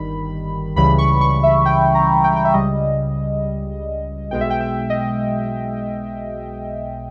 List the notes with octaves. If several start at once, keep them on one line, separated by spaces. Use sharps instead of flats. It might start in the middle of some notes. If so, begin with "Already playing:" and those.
Already playing: G1 D#3 G3 B5
C#2 C#3 E3 G3 B5
C#6
C#6
E5
G5
A#5
G5
G5
E5
C#2 C#3 G3 D#5
B1 B2 G#3 G5
E5
G5
E5
D#5